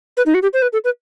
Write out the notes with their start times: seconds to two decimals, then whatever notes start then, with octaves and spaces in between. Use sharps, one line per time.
0.17 B4
0.26 D#4
0.34 F#4
0.42 G4
0.53 C5
0.62 B4
0.73 A4
0.84 B4